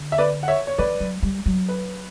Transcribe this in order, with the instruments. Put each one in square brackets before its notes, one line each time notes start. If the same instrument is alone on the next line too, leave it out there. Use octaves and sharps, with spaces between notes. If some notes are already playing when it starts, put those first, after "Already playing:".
Already playing: [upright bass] D3
[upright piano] E5
B4 D5
F#5
C#5 E5
C#5
[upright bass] E3 [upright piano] B4 D5
[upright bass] F#3
G3
F#3
[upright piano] B4